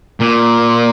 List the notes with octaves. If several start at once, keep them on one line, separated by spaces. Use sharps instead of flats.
A#2